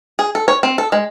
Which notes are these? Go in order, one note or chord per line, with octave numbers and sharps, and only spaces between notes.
G#4
A4
C#5
C4
A4
G#3